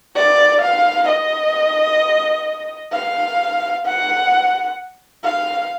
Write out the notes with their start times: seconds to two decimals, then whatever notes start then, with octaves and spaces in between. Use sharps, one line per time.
0.15 D5
0.61 F5
1.08 D#5
2.93 F5
3.85 F#5
5.24 F5